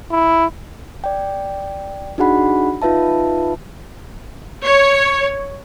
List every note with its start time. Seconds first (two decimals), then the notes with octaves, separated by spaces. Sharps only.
0.11 E4
1.04 D5 G5
2.18 D4 D#4 F#4 G#4 F#5 B5
2.82 D#4 F4 B4 E5 A5
4.65 C#5